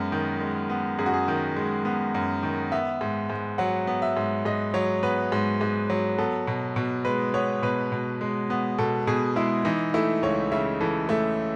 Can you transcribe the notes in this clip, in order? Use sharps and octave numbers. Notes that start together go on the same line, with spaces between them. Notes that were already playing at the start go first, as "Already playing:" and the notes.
Already playing: F#2 G#3 B3
D#3
G#3
B3
F#2 G#4
F#4
G#4
D#3
G#3
B3
F#2
D#3
B3 E5
G#2
G#2
F#3 F#5
B3
E5
G#2
G#2 D#5
F#3 C#5
B3 B4
G#2
G#2
F#3
B3 A4
B2
B2
G#3 B4
B3 C#5
B2 B4
B2
G#3
B3
B2 A4
B2 G#4
G#3 E4
E3 D#4
A3 E4
C#2 C#5
C#3 E5
E3 A4
A3 E5